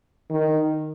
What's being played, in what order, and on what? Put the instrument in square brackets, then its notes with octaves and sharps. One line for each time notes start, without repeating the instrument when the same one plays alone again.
[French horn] D#3